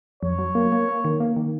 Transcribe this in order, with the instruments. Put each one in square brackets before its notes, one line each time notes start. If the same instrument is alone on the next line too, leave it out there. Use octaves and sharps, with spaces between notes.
[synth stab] F2 [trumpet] C#5
[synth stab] F#3
A#3
A#3
A#3
D#3
A#3
D#3